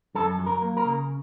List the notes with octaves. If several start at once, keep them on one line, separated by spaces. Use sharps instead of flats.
F#2 A4
F#3
A#4
A#3
A#4
C#3